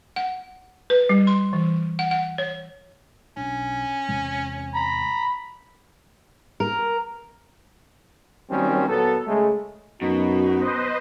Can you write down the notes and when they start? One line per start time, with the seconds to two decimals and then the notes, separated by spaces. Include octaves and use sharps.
0.16 F#5
0.90 B4
1.09 G3
1.27 C6
1.53 E3
1.99 F#5
2.11 F#5
2.38 C#5
3.37 B1 C#4 D4
4.09 E2 C3 G#3
4.75 A#5 B5
6.60 A#4
8.51 D#3 F#3 G3 A#3 C4 C#4
8.89 A#2 F#3 B3 A4
9.27 C#3 G#3 A3
10.02 F#2 B2 D#4 F#4
10.60 B4 C5 D#5